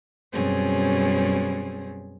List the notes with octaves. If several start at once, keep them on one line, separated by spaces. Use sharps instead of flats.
F#2 B2 G3 C4 C#4 G#4